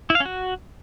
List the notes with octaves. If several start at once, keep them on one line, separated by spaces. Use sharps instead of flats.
E4
F5
C#4
F#4